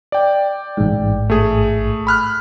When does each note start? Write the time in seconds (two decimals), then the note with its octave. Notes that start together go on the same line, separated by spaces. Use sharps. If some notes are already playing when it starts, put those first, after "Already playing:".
0.12 D5 G5
0.77 A1 G#2
1.30 A3 G#4
2.07 B5 F6 F#6